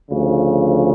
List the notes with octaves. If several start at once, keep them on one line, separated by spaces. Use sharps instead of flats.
D2 C#3 F3